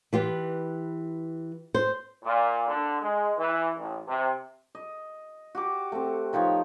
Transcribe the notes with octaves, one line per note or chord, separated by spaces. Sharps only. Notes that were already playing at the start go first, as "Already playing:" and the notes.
E3 F4 G4 B4
C5
A#2
D3
G#3
E3
A1
C3
D#5
F#4 G4 D6
A3 C4
D#3 F3 D#4 C#5